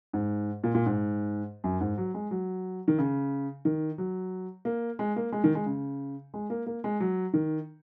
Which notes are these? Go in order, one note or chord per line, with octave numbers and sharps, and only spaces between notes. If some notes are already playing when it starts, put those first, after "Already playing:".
G#2
A#2
A#2
G#2
F#2
G#2
F#3
G#3
F#3
D#3
C#3
D#3
F#3
A#3
G#3
A#3
G#3
D#3
G#3
C#3
G#3
A#3
A#3
G#3
F#3
D#3